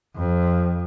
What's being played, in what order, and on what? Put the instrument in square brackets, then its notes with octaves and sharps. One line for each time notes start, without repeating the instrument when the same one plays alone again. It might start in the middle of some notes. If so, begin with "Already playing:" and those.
[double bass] F2